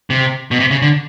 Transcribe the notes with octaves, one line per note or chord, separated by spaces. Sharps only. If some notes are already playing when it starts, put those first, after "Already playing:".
C3
B2
C3
C#3
D3